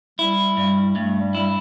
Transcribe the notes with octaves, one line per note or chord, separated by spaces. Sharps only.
G3 E4
G2 G3
G2 A3
G3
G3 E4